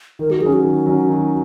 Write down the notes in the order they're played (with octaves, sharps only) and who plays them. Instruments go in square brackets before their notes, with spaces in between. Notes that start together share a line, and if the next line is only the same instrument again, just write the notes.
[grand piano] D#3 [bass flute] A#4
[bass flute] F#4
[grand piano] F#3 C#4 [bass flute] G#4
[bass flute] F#4
[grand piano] D#3
F#3 C#4
D#3